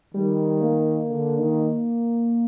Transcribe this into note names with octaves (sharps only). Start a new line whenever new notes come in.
D#3 G3
A#3
D3
D#3